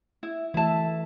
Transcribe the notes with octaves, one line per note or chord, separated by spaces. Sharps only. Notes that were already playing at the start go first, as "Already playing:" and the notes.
E4
E3 A3 E4 E5 A5